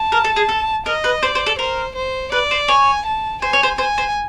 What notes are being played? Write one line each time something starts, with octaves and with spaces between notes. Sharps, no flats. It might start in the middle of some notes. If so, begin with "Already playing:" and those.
Already playing: A5
A#4
A4
G#4
A4
A#4 D#5
B4
C5 D5
C5
A4
A#4 C5
C5
B4 D5
C5
C#5 G#5
A5
C5 G#5
C#5
C5
C5 G#5
C5